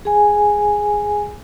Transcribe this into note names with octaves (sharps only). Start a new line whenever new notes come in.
G#4 G#5